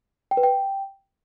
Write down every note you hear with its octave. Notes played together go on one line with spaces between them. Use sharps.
G5
B4
G5